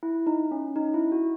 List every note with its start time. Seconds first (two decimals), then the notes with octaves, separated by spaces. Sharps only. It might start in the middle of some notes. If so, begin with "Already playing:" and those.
0.03 E4
0.27 D#4
0.51 C#4
0.76 D#4
0.94 E4
1.12 F#4